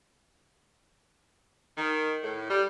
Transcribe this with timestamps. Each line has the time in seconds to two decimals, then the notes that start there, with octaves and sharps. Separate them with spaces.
1.77 D#3
2.24 A2
2.50 G3